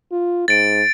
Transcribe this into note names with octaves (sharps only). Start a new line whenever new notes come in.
F4
G#2 A6 D7